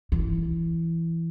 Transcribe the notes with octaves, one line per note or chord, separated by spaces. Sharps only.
E3